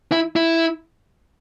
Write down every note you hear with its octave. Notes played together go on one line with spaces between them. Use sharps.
E4
E4